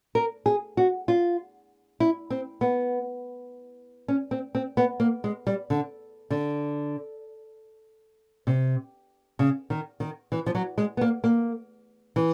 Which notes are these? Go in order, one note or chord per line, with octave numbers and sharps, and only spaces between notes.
A#4
G#4
F#4
F4
E4
C4
B3
C#4
C4
C4
B3
A#3
G#3
G3
D3
D3
C3
C#3
D#3
D#3
E3
F3
F#3
G#3
B3
A#3
A#3
E3